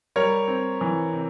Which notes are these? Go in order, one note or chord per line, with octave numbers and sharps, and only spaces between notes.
G3 A#4 C#5
C4
E3
C3